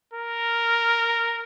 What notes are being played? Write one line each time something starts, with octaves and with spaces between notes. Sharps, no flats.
A#4